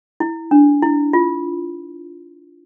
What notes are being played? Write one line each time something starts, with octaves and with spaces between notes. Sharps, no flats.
E4
D4
E4
F4